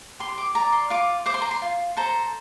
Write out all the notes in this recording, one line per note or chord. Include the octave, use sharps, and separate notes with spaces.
G4 C6
D6
D5 A#5
C6
F4 D6
C5 D6
C6
A#5
C6
F4
A4 C5 A#5